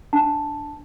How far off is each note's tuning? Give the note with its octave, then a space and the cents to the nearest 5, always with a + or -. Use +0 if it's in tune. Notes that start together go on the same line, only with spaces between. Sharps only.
D4 +0 A5 +0